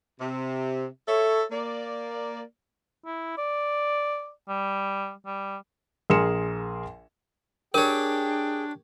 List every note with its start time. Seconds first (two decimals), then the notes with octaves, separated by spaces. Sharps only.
0.20 C3
1.08 A4 C#5 E5
1.52 A#3 D5
3.06 E4
3.38 D5
4.49 G3
5.26 G3
6.10 A#1 G#4 A#4 C6 C#7 E7
7.74 D4 G4 G#4 A#4 C#5 G5